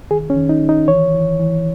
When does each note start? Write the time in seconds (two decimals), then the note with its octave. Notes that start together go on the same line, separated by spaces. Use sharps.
0.11 D#3 G#4
0.30 C#4
0.37 D#3
0.49 D#4
0.62 D#3
0.69 D#4
0.88 E3 C#5
1.14 E3
1.39 E3